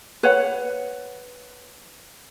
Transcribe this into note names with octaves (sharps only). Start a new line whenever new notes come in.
B4 C#5 F#5